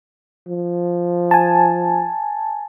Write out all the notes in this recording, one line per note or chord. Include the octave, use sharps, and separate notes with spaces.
F3
G#5 A5